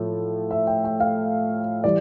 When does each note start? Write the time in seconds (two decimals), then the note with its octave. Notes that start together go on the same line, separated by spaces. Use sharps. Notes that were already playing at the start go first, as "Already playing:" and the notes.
Already playing: A2 F3 A3
0.51 E5
0.67 G5
0.84 G5
1.00 F5
1.84 E3 G3 D5